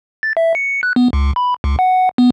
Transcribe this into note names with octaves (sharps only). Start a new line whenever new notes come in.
A6
E5
C#7
F#6
B3
C#2
B5
C#2
F#5
B3